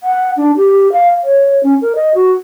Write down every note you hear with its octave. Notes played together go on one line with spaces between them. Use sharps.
F#5
D4
G4
F5
C#5
C#4
A#4
D#5
F#4